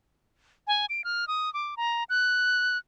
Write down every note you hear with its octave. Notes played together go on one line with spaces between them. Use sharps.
G#5
D7
F6
D#6
D6
A#5
F#6